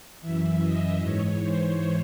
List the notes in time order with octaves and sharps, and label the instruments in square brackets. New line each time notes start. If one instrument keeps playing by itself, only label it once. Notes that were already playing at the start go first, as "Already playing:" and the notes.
[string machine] F#2 E3 E5
D#5
G#2 E3 C#5
C5